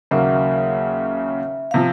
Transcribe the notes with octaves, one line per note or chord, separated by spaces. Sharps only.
D#2 C#3 F#3 A#3 E5
C3 F3 F5